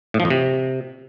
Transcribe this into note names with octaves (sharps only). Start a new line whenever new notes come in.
A2
F3
F2
C3